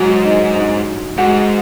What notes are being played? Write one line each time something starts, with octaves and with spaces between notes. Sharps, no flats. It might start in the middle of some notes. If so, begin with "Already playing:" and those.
Already playing: G#2 F#3 F#4
D#4 D#5
D#4 D#5
G#2 F#4 F#5